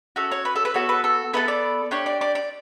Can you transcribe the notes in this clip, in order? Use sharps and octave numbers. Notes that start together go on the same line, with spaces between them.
C#4 F#4 A4
C#5
B4
A4
B4
B3 F#4 A4 C#5
B4
A4
B3 E4 A4 B4
D5
D4 G4 C#5
D5
D5
D5